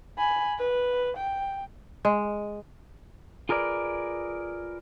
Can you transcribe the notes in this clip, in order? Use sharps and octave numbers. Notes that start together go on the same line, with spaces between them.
G#5 B5
B4
G5
G#3
F4 G#4 A#4 B4 D5